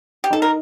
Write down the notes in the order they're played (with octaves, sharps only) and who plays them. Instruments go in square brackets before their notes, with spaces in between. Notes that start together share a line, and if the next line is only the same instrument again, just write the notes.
[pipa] G4
[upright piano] D#4 [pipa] A4
[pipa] A#4